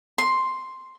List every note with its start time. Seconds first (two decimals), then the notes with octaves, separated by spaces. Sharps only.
0.18 C6